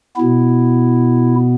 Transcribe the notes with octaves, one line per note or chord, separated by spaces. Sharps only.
B2 B3 E4